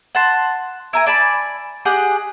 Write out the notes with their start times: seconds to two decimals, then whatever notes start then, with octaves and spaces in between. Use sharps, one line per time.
0.15 F#5 A5 C6
0.93 E4 A#4 G#5
1.06 D5 G#5 A5 B5
1.85 G4 G#4 D#5 F#5